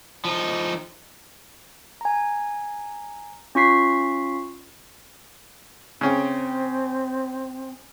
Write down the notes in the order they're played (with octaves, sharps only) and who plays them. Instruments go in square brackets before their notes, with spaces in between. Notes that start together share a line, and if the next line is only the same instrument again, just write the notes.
[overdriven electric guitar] F3 D#4
[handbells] G#5 A#5
C#4 F4 C#6 B6 C7
[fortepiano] C#3 C#4 G5 [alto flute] C4